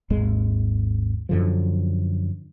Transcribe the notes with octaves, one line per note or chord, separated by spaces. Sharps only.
G#1 D#2 G#3
F#2 D3 F3